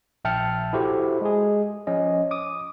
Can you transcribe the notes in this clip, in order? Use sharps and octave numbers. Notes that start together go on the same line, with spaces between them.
A#1 E5 G5 A5 F6 C#7
E4 F#4 G4 A4 C5
G#3 G#4
F3 C#4 D#5
D6 D#6